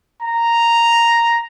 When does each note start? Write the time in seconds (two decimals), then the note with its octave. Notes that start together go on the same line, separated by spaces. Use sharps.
0.22 A#5